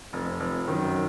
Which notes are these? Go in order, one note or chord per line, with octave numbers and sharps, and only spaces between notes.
F1 F2
F1
F#2 D#3